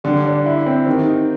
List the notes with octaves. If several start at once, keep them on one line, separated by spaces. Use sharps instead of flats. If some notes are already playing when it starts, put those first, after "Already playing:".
D3 G3
D4
E4
C4
D#3 G4
D#4